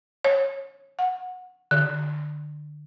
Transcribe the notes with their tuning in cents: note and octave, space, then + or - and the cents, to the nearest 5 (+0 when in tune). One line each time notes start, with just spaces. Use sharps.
C#5 -20
F#5 -15
D3 +25